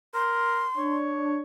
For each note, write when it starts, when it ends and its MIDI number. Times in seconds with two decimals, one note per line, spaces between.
0.14 0.63 70
0.14 0.96 84
0.77 1.42 62
0.77 1.40 73